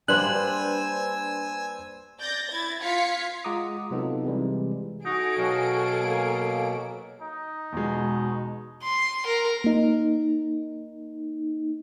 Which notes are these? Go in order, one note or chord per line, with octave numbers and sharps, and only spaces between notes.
G3 A#3 D4 B4 C5 G#5 E6 F#6
D5 G6 A6 A#6
E4 G#6 A6
F4 F5 G#6 B6 C#7
G#3 F4 F#5 A#5 D6 D#6
C3 F#3 B3 D#4 F4 A4
C3 E3 G3 G#3
D#4 F#4 G#4 A4 D7
B2 F#3 F5
A#3
D#4
E2 B2 G#3
C6
A#4
A#3 D#4